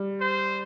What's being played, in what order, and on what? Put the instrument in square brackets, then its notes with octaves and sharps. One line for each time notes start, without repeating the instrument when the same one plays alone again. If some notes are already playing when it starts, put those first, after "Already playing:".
Already playing: [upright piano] G3
[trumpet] C5